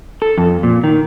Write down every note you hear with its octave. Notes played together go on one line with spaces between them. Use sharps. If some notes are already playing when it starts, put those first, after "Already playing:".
A4
F2
A#2
D#3